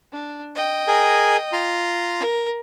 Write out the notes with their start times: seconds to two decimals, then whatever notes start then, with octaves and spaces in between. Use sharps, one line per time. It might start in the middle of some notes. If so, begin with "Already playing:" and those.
0.12 D4
0.55 D#5 G5
0.88 G#4 A#4 G#5
1.53 F4 A#5 C6
2.20 A#4